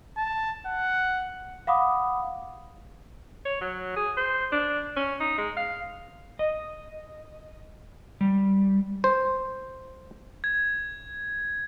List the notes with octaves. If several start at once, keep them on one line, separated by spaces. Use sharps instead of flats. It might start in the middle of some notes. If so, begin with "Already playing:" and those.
A5
F#5
F5 F#5 B5 D6 D#6
C#5
F#3
G#4
C5
D4
C#4
D#4
G#3
F5
D#5
G3
C5
G#6